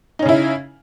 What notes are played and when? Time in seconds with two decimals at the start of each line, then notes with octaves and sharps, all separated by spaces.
0.19 D#4
0.22 C#4
0.26 C#3
0.29 E4